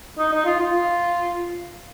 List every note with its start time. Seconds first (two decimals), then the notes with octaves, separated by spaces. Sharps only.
0.19 D#4
0.33 D#4
0.46 F4
0.60 F4